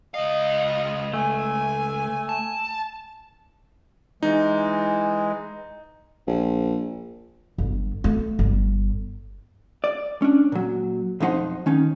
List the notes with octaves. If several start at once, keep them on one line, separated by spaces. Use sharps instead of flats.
C#2 D#5 F5
A3 G#5
A5
E3 G#3 D#4
A#1
G1
A3
G1
D5
C#4 D4
A#2 F#3
B1 F2 F3 D#4 C5 F#5
D#3 C#4 D#4